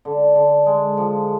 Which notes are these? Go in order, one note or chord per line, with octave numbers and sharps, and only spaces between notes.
D3
D3
G#3
F3